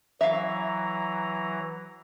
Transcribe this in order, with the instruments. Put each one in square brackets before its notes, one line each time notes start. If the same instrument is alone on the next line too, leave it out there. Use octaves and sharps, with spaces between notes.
[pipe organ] E3 F#3 A#5 [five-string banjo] E5 F5